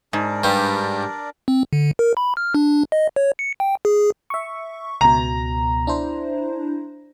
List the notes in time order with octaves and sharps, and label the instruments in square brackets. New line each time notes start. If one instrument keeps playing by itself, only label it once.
[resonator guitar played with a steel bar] G#2 [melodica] D4 A#4 D5
[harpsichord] G2 G3
[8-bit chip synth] C4
D3
A#4
B5
F6
D4
D#5
C#5
C#7
G5
G#4
[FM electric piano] E5 C#6
[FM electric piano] C#2 B2 [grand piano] A#5
[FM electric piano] D4 E4 C5